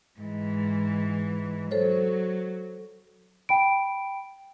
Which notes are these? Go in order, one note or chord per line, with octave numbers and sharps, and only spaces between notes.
G#2 E3
F#3 A4 C5 C#5
G5 B5 D7